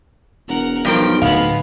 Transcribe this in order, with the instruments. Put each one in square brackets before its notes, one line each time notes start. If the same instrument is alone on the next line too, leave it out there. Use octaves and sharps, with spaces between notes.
[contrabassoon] E1 [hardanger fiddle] A#4 F#5
[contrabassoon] B1 [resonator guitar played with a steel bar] G2 F3 A#4 [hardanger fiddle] G5
[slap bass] D1 [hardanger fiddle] G#3 B3 [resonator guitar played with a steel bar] F5